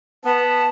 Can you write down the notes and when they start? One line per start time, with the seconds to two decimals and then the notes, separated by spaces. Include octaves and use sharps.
0.24 B3 A5